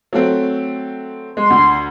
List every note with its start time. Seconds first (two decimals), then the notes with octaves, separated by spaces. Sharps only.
0.13 F#3 A3 C4
1.37 G#3 C6
1.50 D2